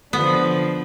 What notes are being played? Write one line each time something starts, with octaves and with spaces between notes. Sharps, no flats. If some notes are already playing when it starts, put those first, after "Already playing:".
D3 F3 B3